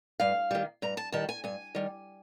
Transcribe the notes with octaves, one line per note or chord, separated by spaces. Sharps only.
G2 F5
D#3 G3
G2 A#5
A5
D#3 G3 A5
G#5
G2 G#5
D#3 G3